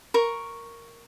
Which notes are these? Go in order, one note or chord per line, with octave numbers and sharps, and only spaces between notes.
A#4 C#6